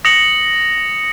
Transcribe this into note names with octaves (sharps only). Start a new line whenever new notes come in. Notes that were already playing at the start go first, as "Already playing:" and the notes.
D#6 A#6 C#7 F#7